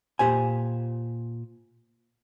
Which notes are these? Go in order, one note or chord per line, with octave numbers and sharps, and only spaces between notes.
A#2 G4 C5 G#5